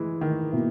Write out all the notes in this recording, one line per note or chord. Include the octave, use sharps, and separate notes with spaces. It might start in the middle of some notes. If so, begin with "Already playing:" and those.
Already playing: E3 G#3
D#3
B2 A#3 E4